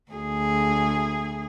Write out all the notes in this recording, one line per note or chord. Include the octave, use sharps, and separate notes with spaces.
D2 G#4